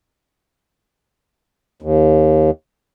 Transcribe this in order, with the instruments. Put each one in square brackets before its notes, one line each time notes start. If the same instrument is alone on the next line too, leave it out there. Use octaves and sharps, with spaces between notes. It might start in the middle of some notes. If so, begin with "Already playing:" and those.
[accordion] D#2